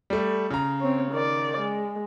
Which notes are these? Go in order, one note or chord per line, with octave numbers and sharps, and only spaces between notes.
G3 A3
C#3 A#5
C4 C#5
D#3 D5
G#3